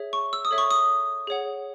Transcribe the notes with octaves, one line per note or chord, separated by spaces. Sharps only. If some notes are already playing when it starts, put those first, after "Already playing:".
Already playing: G#4 C#5 E5
C#6
E6
D#6
A4 C#5 E5
C#6
D#6
G#4 C#5 F#5